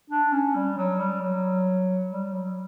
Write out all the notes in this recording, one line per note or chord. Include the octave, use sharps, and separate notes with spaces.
D4
C#4
G3
F#3
G3
F#3
G3
F#3